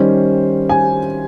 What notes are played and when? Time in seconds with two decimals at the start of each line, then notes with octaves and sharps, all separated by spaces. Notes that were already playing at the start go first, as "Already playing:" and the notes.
Already playing: D#3 G3 C#4 C5
0.69 G#5